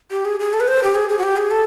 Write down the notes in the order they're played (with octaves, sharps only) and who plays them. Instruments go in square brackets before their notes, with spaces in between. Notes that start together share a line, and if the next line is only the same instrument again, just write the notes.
[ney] G4
G#4
G#4
A4
B4
C5
G4
G#4
G#4
F#4
G4
G#4
A4